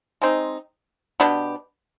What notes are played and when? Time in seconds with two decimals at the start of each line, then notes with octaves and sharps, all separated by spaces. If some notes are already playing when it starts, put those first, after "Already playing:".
0.22 G#3 C4 D#4
1.20 B2 B3 D4 G4